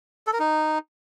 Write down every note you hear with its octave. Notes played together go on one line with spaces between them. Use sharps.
A4
A#4
D#4